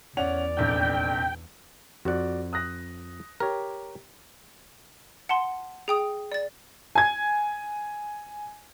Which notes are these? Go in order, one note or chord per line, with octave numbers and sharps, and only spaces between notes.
E2 C#4 D5 F#5 F7
F1 A#1 F2 G5
F2 F#4 D5 F#5
D#6 F#6 A#6
G4 A#4 C#5
F#5 A5 C6
G#4 G5 D#6
D5 A6
G#5 G#6